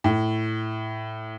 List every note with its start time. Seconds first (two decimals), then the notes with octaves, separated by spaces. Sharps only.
0.04 A2